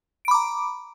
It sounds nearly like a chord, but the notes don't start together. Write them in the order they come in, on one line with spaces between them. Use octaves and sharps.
D7 B5 D6 A#5